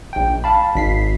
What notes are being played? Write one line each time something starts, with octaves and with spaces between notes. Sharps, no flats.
A#1 G5
F5 A5 B5
G#1 B6 C7